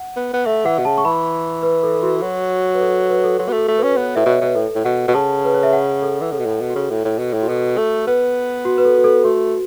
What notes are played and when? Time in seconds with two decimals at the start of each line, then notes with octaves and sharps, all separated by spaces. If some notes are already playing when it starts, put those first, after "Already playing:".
Already playing: F#5
0.17 B3
0.34 B3
0.46 A3 E5
0.66 E3 F#5
0.79 B2
0.85 C#3 A5
0.98 C#6
1.05 E3 B5
1.63 B4
1.83 A4
1.94 A4
2.02 F#4
2.22 F#3
2.74 B4
2.81 A4
3.10 B4
3.24 A4
3.39 F#3 F#4
3.49 B3
3.53 A3
3.58 A4
3.68 A3
3.78 B4
3.83 C#4
3.90 B4
3.97 B3 C#5
4.16 A2 E5
4.26 B2 C#5
4.41 B2 B4
4.56 A2 A4
4.75 A2
4.85 B2 F#5
5.08 B2
5.14 C#3 A5
5.45 B4
5.54 C#5
5.63 E5
5.73 F#5
6.02 A4
6.21 E3
6.31 C#3 A4
6.39 B2
6.46 A2 A4
6.61 B2
6.70 F#4
6.76 C#3
6.90 A2 A4
7.05 A2
7.19 B2
7.34 A2
7.42 F#4
7.49 B2 A4
7.78 A3
8.07 B3 B4
8.65 F#4
8.78 B4
8.85 A4
8.98 F#4
9.04 A4
9.24 A3 F#4